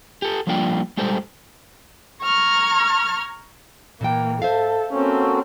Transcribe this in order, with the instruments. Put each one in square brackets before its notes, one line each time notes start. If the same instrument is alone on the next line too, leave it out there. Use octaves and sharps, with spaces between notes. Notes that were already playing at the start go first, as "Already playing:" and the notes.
[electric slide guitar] G4 A4
F3 G3 A#3 D4 F4 G5
G3 G#3 G4 A4 C5
[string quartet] A#5 C#6 F6 G#6
[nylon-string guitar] A#2 E3 G5 [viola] A#3
[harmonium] G#2 [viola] A4 [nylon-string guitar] C5 E5 F5
[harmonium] A#3 F#4 A4 [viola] C4 C#4